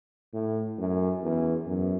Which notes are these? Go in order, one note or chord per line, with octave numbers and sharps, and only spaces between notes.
A2
F#2
E2
F#2